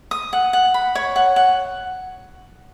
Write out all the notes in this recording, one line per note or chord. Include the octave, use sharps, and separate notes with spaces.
D#6
F#5
F#5
B5
C#5
F#5
F#5